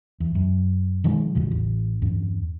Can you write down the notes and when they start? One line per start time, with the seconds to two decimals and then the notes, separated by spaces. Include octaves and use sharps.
0.20 E2
0.35 F#2
1.04 B2 D#3 F3 G#3
1.35 A1 E2 C#3
1.51 A1
2.02 E2 G2